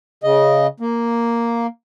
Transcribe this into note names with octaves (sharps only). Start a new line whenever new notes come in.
C#3 D#5
A#3